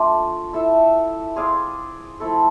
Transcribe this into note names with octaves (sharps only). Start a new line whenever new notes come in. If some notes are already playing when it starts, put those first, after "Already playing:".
Already playing: A3 D4 F4
E4 A4 E5
C4 G#4 D5 F5
F3 A3 E4 A4